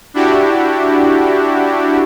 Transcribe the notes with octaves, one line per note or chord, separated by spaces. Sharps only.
D4 E4 F#4 G4